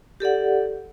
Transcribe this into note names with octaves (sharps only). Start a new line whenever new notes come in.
G4 A4 D5 F#5